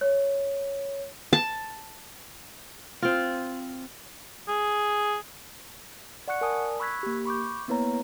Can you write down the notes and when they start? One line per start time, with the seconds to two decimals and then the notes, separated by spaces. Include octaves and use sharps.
0.01 C#5
1.33 A5
3.02 C4 F4
4.49 G#4
6.28 D5 F#5 C#6 F#6 C#7
6.41 A#4 D5 G#5 A5 D#6
6.80 B5 C#6 E6 F#6 G#6 B6
7.03 A#3 G4
7.25 B5 C#6 D6 G6
7.68 A#3 B3 E4 B4 C#5 A#5